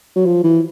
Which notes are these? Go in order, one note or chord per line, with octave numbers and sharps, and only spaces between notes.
F#3
F3
E3